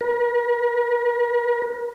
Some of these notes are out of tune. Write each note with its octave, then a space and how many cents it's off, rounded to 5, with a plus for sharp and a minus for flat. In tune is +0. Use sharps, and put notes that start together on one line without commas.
A#4 +45